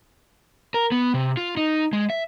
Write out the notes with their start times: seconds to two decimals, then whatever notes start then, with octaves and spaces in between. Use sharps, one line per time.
0.74 A#4
0.92 B3
1.14 C3
1.37 F4
1.57 D#4
1.93 G#3
2.10 E5